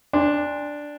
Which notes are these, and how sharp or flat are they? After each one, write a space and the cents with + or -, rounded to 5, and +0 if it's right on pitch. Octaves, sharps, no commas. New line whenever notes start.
D4 +0 G#5 -45 C6 +0